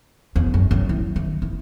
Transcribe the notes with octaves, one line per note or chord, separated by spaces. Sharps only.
E2
F#2
F#2
E3
D#3
E3